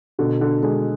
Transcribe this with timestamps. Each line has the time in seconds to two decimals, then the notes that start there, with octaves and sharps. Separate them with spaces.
0.19 B2 D3
0.41 D3
0.62 D3 G#3